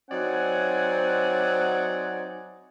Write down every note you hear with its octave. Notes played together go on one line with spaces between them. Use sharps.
F#3 C4 D#4 D5 F#5 G#5